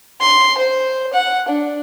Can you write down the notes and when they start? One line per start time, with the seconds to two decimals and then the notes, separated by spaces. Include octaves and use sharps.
0.21 C6
0.57 C5
1.13 F#5
1.48 D4